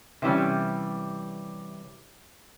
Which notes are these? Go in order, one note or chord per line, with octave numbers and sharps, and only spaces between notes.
C3 E3 G3 C#4